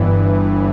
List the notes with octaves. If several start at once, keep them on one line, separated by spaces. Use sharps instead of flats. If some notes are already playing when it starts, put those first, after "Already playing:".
Already playing: G1 G2 E3
G1